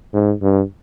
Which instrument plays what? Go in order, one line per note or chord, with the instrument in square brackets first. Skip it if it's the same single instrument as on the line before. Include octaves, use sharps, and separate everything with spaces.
[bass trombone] G#2
G2